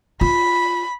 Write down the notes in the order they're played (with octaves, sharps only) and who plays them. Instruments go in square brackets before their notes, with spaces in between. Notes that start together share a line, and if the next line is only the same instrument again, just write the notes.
[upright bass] F4 [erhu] B5